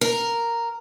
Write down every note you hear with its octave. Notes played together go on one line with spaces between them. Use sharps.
A#4